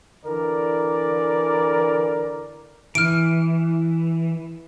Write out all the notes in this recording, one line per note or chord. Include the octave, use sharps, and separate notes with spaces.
D3 E3 A#4 D5
E3 F6 D7